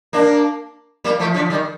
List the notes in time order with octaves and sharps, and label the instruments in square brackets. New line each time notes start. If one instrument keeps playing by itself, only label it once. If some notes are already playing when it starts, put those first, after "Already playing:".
[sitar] A#3 D4
G3 A#3
F3 A3
D3 F3
D#3 G3